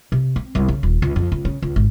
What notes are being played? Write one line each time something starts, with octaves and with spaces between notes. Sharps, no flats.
C3
C4
C2
C#3
D#1
C#2
F2
C#2
C#3
C#2
G#1